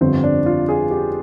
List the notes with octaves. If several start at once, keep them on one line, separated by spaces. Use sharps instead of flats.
G1 F2 D3 G3 C4
D4
F4
G#4
G4